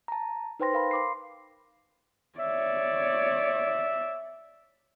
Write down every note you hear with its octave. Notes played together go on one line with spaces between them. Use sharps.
A5 A#5
D#4 B4 C5 G5 C6 A#6
A#4 F5 B5
C6 D6 C7
C#5 D5 E5